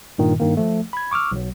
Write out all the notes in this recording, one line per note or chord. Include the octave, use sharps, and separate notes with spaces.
G2 A#2 D#3
G2 D#3 A#3
F3 A3
B5 G#6
C#6 D6 E6 F6
B1 F#3